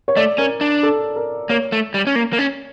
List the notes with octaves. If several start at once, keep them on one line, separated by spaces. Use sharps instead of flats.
C#5
A3 D5
C#4 A#4
D4
A4
A#4
A#3 C#5
A3
G3
C#4
A#3
A#3
C#4